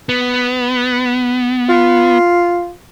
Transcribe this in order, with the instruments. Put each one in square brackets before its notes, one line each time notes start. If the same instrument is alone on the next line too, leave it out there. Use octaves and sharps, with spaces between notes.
[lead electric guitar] B3
[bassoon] F4